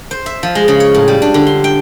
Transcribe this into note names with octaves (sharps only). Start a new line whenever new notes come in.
C5
E5
F3
G#3
C#3
C#5
A2
G3
D4
D3
C6
G5